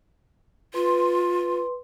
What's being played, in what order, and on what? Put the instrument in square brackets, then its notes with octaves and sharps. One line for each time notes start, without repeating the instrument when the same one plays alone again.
[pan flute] F4 [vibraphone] B4 C6